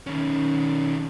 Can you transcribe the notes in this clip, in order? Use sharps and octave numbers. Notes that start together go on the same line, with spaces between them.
D#3 C#4